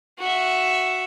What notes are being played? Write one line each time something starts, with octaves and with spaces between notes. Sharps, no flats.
F#4 E5